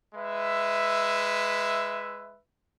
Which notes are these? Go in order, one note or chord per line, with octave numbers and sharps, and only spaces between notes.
G#3 B4 E5